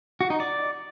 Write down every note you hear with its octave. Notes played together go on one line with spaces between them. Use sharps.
F#4
D#4
D5